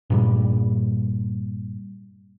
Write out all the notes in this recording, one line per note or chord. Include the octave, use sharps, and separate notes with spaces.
G2 A#2 G3